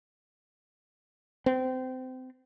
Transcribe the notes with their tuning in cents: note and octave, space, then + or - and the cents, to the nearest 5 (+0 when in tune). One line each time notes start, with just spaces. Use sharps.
C4 -25